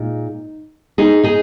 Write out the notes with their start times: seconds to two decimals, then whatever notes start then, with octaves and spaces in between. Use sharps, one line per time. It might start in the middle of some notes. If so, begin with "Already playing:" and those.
Already playing: A#2 G#3 D#4
0.98 D#4 G#4
1.24 D#4 G#4